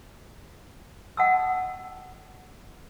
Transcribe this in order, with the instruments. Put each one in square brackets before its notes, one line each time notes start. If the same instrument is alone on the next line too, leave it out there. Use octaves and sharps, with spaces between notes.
[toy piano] D#5 F#5 G5 A5 D#6 E6